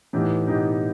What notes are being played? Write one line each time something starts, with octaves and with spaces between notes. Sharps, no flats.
A2 E3 B3 D#4 G4 B4
B2 E3 B3 D#4 G4 B4